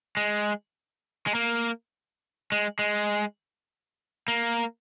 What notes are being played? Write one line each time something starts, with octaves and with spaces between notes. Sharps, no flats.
G#3
G#3
A#3
G#3
G#3
A#3